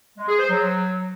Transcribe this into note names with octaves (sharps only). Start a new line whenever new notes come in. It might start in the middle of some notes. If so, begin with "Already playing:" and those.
G#3
G#4
C5
F#3